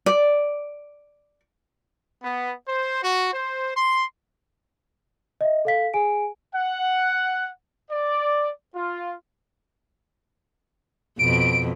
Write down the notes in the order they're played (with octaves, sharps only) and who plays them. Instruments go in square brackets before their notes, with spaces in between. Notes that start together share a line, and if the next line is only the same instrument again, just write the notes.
[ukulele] D5
[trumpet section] B3
C5
F#4
C5
C6
[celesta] D#5 E5
A4 F5 B6
G#4 G#5 D7
[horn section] F#5
D5
F4
[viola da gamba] F2 B2 [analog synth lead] D7